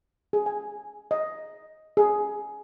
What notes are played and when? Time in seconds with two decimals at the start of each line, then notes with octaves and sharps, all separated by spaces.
0.33 G#4
0.46 G#5
1.11 D#5
1.97 G#4